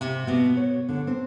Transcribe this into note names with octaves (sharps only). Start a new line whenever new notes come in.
C3
B2
C#5
D3
C4